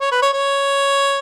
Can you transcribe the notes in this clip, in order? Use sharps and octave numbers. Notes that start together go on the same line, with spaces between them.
C#5
B4
C#5
C#5